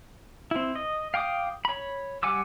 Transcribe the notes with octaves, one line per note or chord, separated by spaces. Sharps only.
C4 E4
D#5
F5 G5 D6 D#6
C#5 B5
G3 F#5 G#5 D6 E6